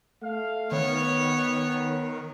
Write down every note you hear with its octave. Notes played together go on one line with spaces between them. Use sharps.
A3 F5
D#3 B3 C#5